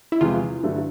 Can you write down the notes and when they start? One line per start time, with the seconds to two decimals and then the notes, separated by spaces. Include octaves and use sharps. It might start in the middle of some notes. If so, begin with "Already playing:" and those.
0.12 E4
0.20 E2 C3 F3 G#3 F4
0.63 G2 D3 F#3 A3